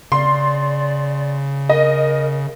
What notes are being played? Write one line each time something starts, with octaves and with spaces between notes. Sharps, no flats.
C#3 D5 C6
A#4 D#5